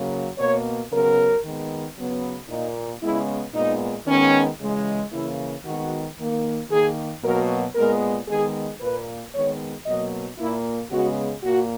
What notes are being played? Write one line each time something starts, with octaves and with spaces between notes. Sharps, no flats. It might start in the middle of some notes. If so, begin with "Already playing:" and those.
Already playing: C#3 F#3 A#3
B2 A#3 C#5
C#3 F#3 B3 A#4
D#3 G#3 B3
C#3 F#3 B3
A#2 A#3 D#4
C#3 G#3 B3 E4
A#2 G#3 B3 D#4
D#3 G#3 B3 C#4
C#3 E3 G#3
C#3 E3 A#3 E4
D#3 G#3 B3 F#4
D#3 A#3
D#3 A#3 G#4
B2 F#3 A#3 A#4
A#2 G#3 B3 A#4
D#3 G#3 B3 G#4
A#2 A#3 B4
D#3 G#3 B3 C#5
B2 F#3 A#3 D#5
A#2 A#3 E4
C#3 G#3 B3 F#4
A#2 A#3 F#4